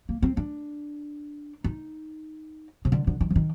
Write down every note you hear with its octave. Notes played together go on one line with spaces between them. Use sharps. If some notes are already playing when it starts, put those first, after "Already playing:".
A#3
C4
D4
D#4
C3
D3
D3
D#3
F3
D#3